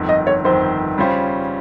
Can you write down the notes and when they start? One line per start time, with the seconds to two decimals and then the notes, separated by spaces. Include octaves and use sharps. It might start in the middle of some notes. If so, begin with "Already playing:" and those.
Already playing: G1 F2 D#3
0.09 D#5
0.27 C#5
0.44 G1 F2 D#3 C5
0.97 C#3 G3 C#4 F4 C5